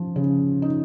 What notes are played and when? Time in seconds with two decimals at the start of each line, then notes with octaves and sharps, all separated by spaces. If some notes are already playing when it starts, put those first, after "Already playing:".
Already playing: F3
0.16 C#3
0.62 D#4